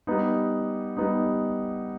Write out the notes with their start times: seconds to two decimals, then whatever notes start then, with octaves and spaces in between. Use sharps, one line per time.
0.07 G3 B3 D#4
0.97 G3 B3 D#4